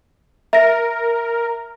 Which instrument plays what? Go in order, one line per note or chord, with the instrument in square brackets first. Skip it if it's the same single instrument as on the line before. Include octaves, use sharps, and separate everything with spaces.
[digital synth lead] A#4 [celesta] E5 A#6